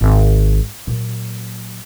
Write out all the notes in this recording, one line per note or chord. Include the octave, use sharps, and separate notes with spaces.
G#1
A#2 F#3